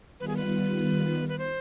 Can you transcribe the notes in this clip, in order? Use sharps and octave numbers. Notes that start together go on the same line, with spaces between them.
D#3 G3 B3 F4 B4
G#4
B4
B4
C5